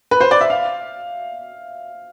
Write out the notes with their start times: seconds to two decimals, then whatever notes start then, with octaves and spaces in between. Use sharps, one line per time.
0.11 B4
0.21 C5
0.31 D5
0.41 E5
0.50 F5